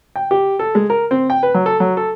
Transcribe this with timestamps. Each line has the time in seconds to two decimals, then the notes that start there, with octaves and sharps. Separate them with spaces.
0.16 G5
0.31 G4
0.59 A4
0.75 G#3
0.90 A#4
1.11 C4
1.30 G5
1.43 B4
1.54 F#3
1.66 A4
1.80 F#3
1.97 A4